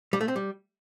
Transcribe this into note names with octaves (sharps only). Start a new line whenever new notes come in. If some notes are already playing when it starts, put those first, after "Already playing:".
G3
A3
C4
G3